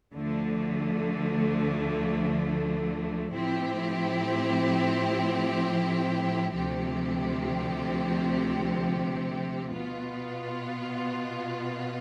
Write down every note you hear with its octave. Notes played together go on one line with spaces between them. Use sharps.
D2 D3 F3 A3
A2 F3 C4 E4 G4
D2 C3 F3 C4 G4
B2 B3 F4